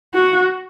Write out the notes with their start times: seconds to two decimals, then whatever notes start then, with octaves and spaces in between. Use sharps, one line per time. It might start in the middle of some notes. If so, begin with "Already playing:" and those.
0.14 F#4